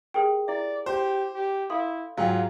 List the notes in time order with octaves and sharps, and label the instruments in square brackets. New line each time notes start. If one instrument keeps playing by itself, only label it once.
[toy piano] G4 [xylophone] G#4 A#4 G5
[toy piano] E4 E5 [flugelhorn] D5
[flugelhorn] G4 [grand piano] C5
[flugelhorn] G4
[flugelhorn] E4 [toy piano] A4 F5 C6 [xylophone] D#6
[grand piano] G#2 F#3 [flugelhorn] F4 [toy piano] F5 G5 G#5